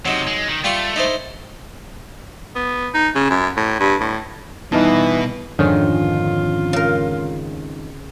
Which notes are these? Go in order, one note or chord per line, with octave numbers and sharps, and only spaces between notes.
C3 F#3 D#4
G#3
D#3
G3 A3 F4 C#6
D#4 E4 C5
B3
D#4
C#3
F#2
A2
G2
A2
B2 E3 G3 D#4 D#5 A5
F2 G#2 D3 D#3 C#4 F4
C#3 A#4